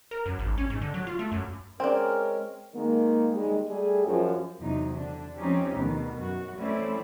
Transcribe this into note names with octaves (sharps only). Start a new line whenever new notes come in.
A#4
F#2
G#1
C#4
G#2
D3
F#3
F4
A3
F#2
G#3 C4 C#4 A#4 D5
D#3 G#3 A#3
D#2 D#3 G3 G#3
G3 A3 G#4
F#2 F3
E2 C3 F#3 D#4
D3 D4
F3 C4 C#4 D#4 G4
D2 B2 D#3
F#2 F#4
E3 A3 C4 C#4 E4 D5